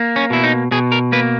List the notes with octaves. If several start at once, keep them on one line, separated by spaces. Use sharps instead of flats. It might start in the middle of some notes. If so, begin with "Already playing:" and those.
Already playing: A#3
C#4
B2 E4
D#4
B2 G#4
A#4
A#3 B4